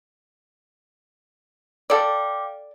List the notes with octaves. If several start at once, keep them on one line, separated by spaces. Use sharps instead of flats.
A4 D5 F5 G5 D6